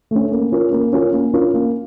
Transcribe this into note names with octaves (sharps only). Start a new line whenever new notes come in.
A3 C#4
A#3
C#4 F4 A#4
A#3
C#4 F4 A#4
A#3
C#4 F4 A#4
A#3